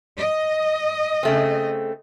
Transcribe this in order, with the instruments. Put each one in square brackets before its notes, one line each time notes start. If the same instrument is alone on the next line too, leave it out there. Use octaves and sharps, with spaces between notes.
[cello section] D#5
[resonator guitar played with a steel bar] C#3 A3 C4